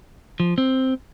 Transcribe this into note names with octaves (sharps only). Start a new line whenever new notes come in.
F3
C4